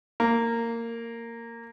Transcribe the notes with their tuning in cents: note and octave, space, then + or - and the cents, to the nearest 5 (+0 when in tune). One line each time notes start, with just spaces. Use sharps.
A#3 -15